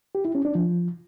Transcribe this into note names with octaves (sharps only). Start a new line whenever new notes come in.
G4
E4
C#4
D4
F3